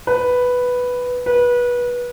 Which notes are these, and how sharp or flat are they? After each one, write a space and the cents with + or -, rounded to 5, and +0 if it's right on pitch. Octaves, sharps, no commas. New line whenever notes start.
B4 +0
B4 -25